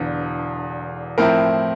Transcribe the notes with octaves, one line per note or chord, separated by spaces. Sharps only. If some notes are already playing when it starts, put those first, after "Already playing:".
Already playing: E1 E2 D3
A2 F3 C4 E4 A#4